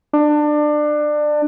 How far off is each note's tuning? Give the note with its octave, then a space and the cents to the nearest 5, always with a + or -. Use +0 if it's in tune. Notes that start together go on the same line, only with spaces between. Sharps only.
D4 +25